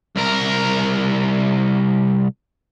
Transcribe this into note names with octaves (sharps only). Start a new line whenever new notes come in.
C2 A#4